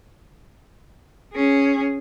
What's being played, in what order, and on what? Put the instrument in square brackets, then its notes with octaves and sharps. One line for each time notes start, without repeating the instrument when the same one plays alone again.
[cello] C#4 G#4